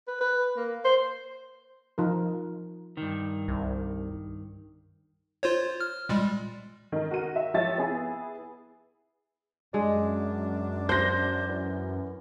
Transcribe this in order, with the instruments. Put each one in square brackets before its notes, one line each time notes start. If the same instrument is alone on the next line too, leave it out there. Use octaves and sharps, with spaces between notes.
[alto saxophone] B4
B4
A#3
C5
[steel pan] F3 D#4 A#4
[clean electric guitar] G2 D#3
[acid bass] C2
[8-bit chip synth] F4 C5 C#5
F6
A#2 G3 G#3
[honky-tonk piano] D#3 A#4
F#4 A#4 D#7
E5
F3 G4 C#5 E5 A6
B3 E4 G#4
[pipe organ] F#2 [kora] G#3 [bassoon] D4
[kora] C5 [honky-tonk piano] G6 A#6
[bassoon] E3